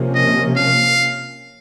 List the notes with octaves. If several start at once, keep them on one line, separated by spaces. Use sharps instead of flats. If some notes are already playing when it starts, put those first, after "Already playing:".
Already playing: C3 F3 A#3 C#4
D#5
F5